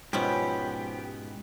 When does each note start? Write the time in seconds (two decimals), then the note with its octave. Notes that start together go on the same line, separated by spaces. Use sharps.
0.13 G#2 B2 F3 B3 C#4 E4 G4